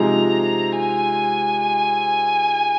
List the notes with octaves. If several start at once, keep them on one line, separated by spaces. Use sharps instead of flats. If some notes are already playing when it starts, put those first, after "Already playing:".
Already playing: C3 F3 G#3 D#4 A#5
G#5